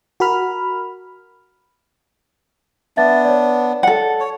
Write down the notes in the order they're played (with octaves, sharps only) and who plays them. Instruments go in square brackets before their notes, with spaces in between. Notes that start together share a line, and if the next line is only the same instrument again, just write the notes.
[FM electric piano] F#4 A#4 B5 F6
[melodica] B3 D4 [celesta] E5 A6
[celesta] C#5 D5
[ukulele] A4 F#5
[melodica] C#5